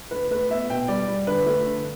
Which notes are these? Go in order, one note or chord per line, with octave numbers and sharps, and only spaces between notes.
D2 B4
A3 B4
B3 E5
B2 G5
G3 D5
G3
D3 B4
A3
D3